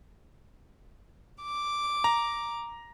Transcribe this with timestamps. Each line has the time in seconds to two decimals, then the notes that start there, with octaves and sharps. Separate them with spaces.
1.42 D6
2.04 A#5